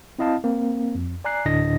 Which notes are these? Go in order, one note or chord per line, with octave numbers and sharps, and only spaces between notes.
C4 E4 D#5 F5 A5
A#3 C4
F2
D5 G#5 A#5 F#6 C7
D2 A2 D3 D4 D#5 A#6